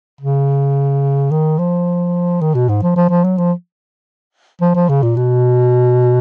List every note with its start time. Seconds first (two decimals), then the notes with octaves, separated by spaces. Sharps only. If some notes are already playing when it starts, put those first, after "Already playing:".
0.21 C#3
1.31 D#3
1.58 F3
2.41 D#3
2.54 B2
2.69 G#2
2.83 F3
2.96 F3
3.10 F3
3.24 F#3
3.38 F3
4.61 F3
4.75 F3
4.89 C#3
5.03 A#2
5.16 B2